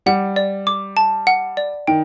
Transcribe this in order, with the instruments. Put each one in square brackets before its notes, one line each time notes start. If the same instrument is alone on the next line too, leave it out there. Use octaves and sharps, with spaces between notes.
[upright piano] G3 [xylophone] F#5
[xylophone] D5
D6
A5
F#5
D5
[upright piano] D#3 [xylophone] G5